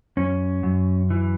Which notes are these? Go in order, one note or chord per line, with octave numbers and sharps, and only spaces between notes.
F#2 C#4
F#2
E3